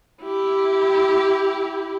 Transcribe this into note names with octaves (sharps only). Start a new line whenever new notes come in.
E4 G4